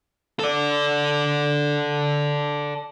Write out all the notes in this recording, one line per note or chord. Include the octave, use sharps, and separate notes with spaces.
A4 D5